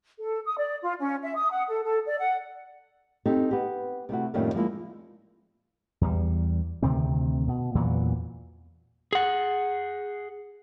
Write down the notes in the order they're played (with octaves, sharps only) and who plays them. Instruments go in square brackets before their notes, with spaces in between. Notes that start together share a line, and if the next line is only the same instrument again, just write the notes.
[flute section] A4
D#6
D5
F4
C#4
E5
D#6
F#5
A4
A4
D5
F#5
[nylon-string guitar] C4 D#4 G4 A4
B3 G4
C3 A3 E4 F#4
F2 A2 D#3 G3 A#3 C#4
F3 G#3 A#3 E4
[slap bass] E2 G3
D2 C3 D#3 C4
B2
E2 A#2 E3 F#3
[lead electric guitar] G#4 F#5